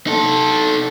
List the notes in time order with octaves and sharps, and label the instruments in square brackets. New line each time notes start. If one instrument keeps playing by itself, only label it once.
[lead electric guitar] D#4 A4